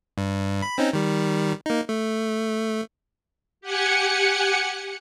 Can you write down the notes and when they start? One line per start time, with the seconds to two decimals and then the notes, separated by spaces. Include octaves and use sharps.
0.18 G2
0.62 B5
0.78 C4 C#4 D#4
0.93 D#3 G3
1.66 A#3 D#4
1.89 A3
3.61 G4 F#5 G#5 C#7